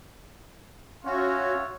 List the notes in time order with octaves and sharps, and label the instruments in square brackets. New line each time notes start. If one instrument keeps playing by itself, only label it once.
[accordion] C#4 F#4 [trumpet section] F4 C#5 E5